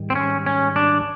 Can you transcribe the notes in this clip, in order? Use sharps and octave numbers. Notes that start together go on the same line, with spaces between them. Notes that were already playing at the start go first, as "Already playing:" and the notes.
Already playing: G#2 D#3 G3
C4
C#4
C#4
D4